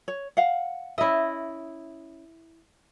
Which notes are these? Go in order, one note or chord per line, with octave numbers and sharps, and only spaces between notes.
C#5
F5 F#5
C#4 E4 D#5 E5